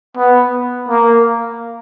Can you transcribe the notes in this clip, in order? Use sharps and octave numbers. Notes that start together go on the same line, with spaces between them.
B3
A#3